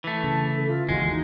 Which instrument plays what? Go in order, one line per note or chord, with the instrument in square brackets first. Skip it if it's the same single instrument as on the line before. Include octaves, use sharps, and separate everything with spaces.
[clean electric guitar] E3 A3
[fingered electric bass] C#3 [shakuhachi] A5
[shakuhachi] A4
F4
[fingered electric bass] G1 D#2 E3 [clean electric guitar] G#3 [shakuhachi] F#4
[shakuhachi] D#4